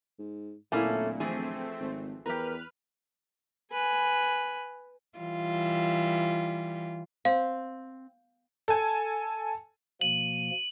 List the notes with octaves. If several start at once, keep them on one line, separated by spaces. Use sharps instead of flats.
G#2
D1 A#2 A3 A#3 C#4 E4 G#5
E3 F3 A3 C4 G#4
G#1
E2 G4 A#4 B4 F6
B4 G#5
E3 G3 F4
C4 F5
A4 G#5
B2 F3 A#3 D#7 F#7